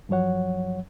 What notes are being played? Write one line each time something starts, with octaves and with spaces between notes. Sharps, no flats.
G2 F3 F#3 C#5 F#5